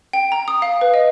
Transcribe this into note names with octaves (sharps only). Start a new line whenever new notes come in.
G5
A#5
D#6
F5
B4
D#5